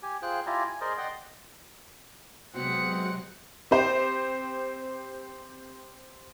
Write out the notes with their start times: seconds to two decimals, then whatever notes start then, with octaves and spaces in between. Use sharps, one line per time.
0.03 G4 G#5
0.22 F4 G#4 C5 G5 F#6
0.47 E4 F4 G4 D5 G#5 A#5
0.67 G#5
0.81 G#4 A#4 C5 D5 D#5 G#5
0.98 D5 D#5 F#5 G5 C6
2.54 C3 F#3 G#3 B3 C4 F#4 F#5 C#7
3.71 C4 G4 C5